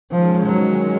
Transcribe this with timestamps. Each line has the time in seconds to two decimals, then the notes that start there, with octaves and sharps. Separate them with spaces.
0.11 D#3 F3 G#3 C#4
0.46 F#3